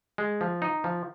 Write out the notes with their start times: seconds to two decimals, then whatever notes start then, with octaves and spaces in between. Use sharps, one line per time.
0.18 G#3
0.41 F3
0.62 D#4
0.84 F3